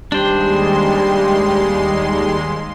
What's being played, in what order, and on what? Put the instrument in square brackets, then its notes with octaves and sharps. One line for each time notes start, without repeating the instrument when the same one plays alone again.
[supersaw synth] D#2 G#3 C6 [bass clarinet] G3 [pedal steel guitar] D4 C5 [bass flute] G4